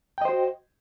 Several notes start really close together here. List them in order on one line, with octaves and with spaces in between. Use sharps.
G5 D#5 C5 F#4